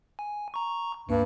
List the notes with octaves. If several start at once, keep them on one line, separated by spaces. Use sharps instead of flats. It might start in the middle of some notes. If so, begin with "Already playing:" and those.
G#5
A#5 C#6
C#2 G2 A#3